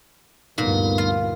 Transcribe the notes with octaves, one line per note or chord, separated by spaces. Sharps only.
D2 G2 A#2 B3 D#4 F5
F4